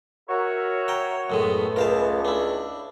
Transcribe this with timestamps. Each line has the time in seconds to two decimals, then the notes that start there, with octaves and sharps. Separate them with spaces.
0.29 F#4 A#4 C#5 E5
0.88 G5 A#5
1.30 F#2 A2 G#3 A3 B3
1.76 C#2 A#4 F5 A5
2.25 D4 E4